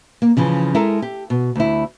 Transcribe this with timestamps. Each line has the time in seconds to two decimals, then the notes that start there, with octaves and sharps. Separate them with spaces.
0.22 A#3
0.37 C#3 E3 F3 C#4
0.74 G#3 E4 A4 A#4
1.02 G4
1.30 B2
1.55 D2 E4